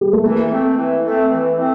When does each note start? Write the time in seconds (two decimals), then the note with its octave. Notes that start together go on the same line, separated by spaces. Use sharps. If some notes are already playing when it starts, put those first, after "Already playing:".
0.01 G3
0.13 A3
0.24 E3 A#3
0.51 A3 C4
0.77 E3
1.04 A3 C4
1.31 E3
1.58 A3 C4